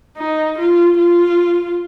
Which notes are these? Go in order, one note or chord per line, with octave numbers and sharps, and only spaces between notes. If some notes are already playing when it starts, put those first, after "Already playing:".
D#4
F4
F4